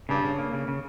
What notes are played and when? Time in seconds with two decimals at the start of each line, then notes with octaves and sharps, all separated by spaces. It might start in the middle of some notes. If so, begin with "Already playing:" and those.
0.09 G2 C#3
0.24 C#3
0.39 A#3
0.53 C#3
0.68 C#3